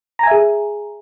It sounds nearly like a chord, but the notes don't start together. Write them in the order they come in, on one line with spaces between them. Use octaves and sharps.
A#5 G#5 E5 G#4